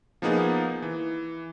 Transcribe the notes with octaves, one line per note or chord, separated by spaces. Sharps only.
F3 A#3 B3 D#4 G#4
E3